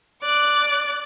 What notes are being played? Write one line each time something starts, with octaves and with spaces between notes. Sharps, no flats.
D5 D6 F#6